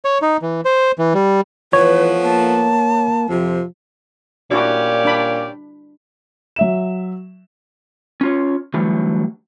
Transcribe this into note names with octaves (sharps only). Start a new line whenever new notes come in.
C#5
D#4
E3
C5
E3
G3
E3 F3 A3 B3 B4 C#5
A#3 A5
F2 C3 F3
A#2 C#4 D4 E4 F#4 G4 D5
D4 B5
F#3 E5 E7
C#4 F4 C#5
D3 E3 F#3 G3 A3